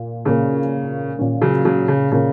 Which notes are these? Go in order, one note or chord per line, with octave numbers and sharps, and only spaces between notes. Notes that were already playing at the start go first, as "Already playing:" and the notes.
Already playing: A#2 A#3
A#2 C#3 A#3 C#4
A#2 A#3 C#4
C#3 F#3
C#3 F#3
C#3
A#2 C#3 A#3 C#4